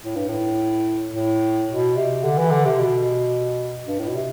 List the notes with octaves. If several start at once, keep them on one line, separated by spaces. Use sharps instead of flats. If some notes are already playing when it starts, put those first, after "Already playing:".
A2
G2
A2
A2
B2
C3
D3
E3
D3
C3
B2
G2
A2
B2
C3